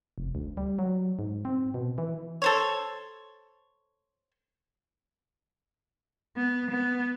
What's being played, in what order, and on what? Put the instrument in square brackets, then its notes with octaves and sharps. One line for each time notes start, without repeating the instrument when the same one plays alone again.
[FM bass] F1
D2
G3
F#3
G#2
C4
B2
E3
[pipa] A4 C5 C#5
[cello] B3
B3